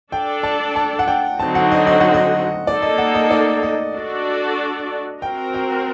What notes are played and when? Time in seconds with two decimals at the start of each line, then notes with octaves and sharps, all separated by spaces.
0.12 D4 A4 D5 G5
0.43 A5
0.76 A5
0.99 F#5
1.08 G5
1.39 D3 F#3 C4 D#4 F#4 A5
1.55 F#5
1.72 D#5
1.87 D#5
2.00 F#5
2.14 D#5
2.67 A#3 D#4 A4 D5
2.82 D#5
2.98 F#5
3.15 D#5
3.31 D5
3.63 D#5
3.95 D4 F#4 A4 D5
5.22 C4 F#4 A#4 G5
5.54 G5